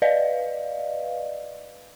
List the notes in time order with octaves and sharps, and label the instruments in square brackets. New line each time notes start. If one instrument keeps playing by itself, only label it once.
[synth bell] B4 D5 D#5 F5